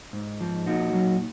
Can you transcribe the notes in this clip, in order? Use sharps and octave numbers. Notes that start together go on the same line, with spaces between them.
G#2
F3
A#2 D#4 F#4
F#3